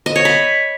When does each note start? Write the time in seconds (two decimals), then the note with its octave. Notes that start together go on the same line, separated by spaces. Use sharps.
0.06 D#5
0.16 C#5
0.25 B5